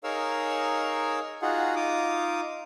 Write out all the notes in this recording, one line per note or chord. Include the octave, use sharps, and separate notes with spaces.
D#4 G#4 A#4 C#5 F5 E6
D#4 F4 F#4 G#4 F#5
D#4 F4 D6 D#6